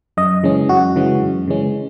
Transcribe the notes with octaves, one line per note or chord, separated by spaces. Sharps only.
F#2 D#5
C#3 E3 G#3 C#4
F#2 F#4
C#3 E3 G#3 C#4
F#2
C#3 E3 G#3 C#4